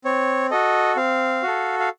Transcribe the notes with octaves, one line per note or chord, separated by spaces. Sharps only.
C4 C#5
F#4 A4 D#5
C4 F5
F#4 A4
F5